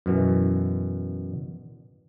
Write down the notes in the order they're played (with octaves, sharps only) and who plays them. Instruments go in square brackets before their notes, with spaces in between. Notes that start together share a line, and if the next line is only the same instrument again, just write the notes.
[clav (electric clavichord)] F#2 B2 E3